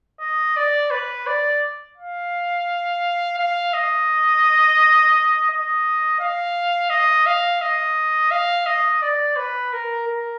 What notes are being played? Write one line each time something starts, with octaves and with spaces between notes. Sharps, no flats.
D#5
D5
B4
D5
F5
F5
D#5
D#5
F5
D#5
F5
D#5
F5
D#5
D5
B4
A#4
A#4